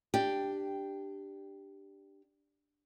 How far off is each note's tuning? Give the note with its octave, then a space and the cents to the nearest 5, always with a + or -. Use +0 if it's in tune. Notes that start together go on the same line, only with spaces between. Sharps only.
D4 +5 G4 +0